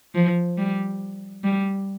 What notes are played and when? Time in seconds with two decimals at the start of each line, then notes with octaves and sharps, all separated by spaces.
0.15 F3
0.58 G3
1.44 G3